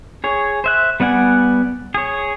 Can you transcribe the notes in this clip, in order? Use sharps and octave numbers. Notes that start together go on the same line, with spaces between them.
G#4 C#5
C5 E5 F#6
G3 B3 D5 F#5 G#5
G#4 C#5